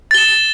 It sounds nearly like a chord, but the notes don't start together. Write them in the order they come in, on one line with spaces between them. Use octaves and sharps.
A6 G7 E7